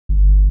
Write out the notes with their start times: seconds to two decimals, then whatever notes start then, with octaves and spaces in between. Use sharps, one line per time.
0.09 G1